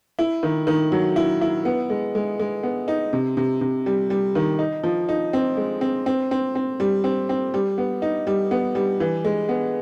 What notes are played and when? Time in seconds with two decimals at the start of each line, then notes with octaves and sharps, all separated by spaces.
0.19 E4
0.43 D#3
0.67 D#3
0.92 F#3
1.16 E4
1.41 E4
1.65 B3
1.90 G#3
2.15 G#3
2.39 G#3
2.63 B3
2.88 D#4
3.13 C3
3.37 C3
3.61 C3
3.86 G3
4.10 G3
4.35 D#3
4.59 D#4
4.83 F3
5.09 D#4
5.33 C4
5.57 G#3
5.81 C4
6.06 C4
6.31 C4
6.55 C4
6.80 G3
7.04 C4
7.29 C4
7.54 G3
7.78 B3
8.02 D#4
8.27 G3
8.51 B3
8.75 G3
9.00 E3
9.25 G#3
9.49 B3